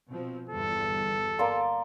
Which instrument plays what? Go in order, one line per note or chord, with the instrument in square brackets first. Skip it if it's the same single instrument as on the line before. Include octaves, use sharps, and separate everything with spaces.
[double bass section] B2 F3 C4
[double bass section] G1 E2 G2 [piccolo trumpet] A4
[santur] A#3 D5 C6